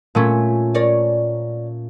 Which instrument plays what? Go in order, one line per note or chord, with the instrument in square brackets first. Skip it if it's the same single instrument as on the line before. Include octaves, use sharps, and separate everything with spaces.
[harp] A#2 A3 C#4
[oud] A#4 C#5 D5